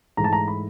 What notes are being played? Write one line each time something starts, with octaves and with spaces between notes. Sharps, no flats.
G#2 E3 A3 A#5
A5
A#5
B5